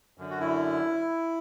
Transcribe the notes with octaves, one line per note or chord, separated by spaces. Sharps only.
F#2 D3
F#4
E4